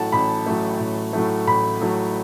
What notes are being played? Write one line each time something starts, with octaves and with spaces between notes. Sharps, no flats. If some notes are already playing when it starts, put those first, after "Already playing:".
Already playing: A1 A2 F#3 A3 F#5 A5
A1 B5
A2 F#3 A3
A1
A2 F#3 A3
A1 B5
A2 F#3 A3